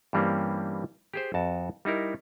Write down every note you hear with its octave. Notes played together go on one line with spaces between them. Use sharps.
G2 E3 G3 A#3 C4 C#4
G4 G#4 C5
F2 F#4 A5
G3 D#4 E4 A#4